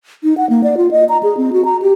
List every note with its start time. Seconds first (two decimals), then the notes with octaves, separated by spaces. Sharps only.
0.24 D#4
0.37 F#5
0.49 A#3
0.64 D5
0.77 F4
0.91 D#5
1.09 A#5
1.23 G#4
1.37 C4
1.53 F#4
1.65 A#5
1.82 G4